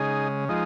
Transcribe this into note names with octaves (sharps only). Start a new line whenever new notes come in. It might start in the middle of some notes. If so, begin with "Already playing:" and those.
Already playing: C#3 G#3 D#4 G#4
F3 G#3 D#4